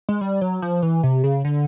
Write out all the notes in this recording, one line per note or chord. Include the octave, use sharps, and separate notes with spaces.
G#3
G3
F#3
F3
E3
C3
C#3
D3